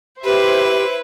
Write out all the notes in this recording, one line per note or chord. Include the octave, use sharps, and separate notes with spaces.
E4 G4 B4 C5 E5